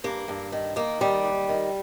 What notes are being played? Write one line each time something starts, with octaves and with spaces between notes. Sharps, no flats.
G2 A#3
G2
D#3
D#3 A#3
D#2 G3
D#2
D#3